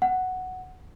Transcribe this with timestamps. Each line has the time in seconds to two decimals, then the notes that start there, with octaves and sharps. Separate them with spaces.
0.02 F#5